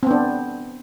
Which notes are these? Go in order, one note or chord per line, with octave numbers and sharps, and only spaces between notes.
B3 C4 D4